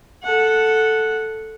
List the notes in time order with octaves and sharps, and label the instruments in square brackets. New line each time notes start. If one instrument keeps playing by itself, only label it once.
[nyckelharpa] A4 F#5